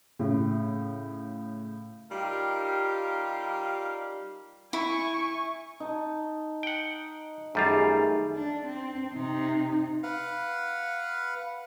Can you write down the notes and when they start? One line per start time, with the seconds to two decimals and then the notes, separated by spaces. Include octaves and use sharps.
0.19 A2 C#3
2.11 G3 D#4 F4 G4 A#4
4.73 E4 G#5 C#6
5.80 D#4 A5
6.63 F#5 G5
7.55 F#2 D#3 G3 A3 D#4 F4 G#4
8.34 D4
8.67 C4
9.13 C3 D#4
10.03 B4 F5 F#5